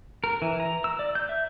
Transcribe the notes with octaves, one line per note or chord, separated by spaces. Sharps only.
A#4
E3
A#5
E6
D5
G6
E5